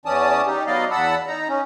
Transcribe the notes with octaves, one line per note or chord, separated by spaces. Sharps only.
E2 E3 C#4 D5 A5 D#6
D#4 G4
F#3 B3 D5 D#5 F5
E2 F#5 A5 B5 E6
D#4 A#5
C#4